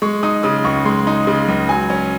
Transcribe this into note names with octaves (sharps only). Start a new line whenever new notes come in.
G#3 C#6
D#4 D#6
C#3 D#6
C#2 C#6
G#3 C6
D#4
C#3
C#2
F#3 G#5
C#4